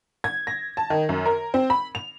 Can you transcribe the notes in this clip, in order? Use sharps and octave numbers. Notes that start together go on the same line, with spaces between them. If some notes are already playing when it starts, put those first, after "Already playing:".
G#6
A#6
A5
D#3
F#2
A#4
C4
B5
F7